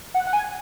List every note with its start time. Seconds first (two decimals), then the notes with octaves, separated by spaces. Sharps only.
0.14 F#5
0.27 F#5
0.33 G#5